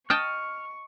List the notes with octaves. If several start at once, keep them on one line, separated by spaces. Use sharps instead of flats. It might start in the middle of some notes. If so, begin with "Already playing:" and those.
D#5 G5 A5 C#6 F6